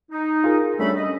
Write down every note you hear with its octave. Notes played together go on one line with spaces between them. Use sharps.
D#4
F4 G#4 A#4
G3 A3 C#4 D4 A4 B5
D#5